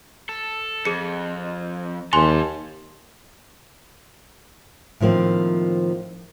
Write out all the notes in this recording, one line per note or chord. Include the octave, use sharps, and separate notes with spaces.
A4
F2 G#4 C#7
D#2 G4 G#5 A5 C6 G7
A2 D#3 F3 A#3 C4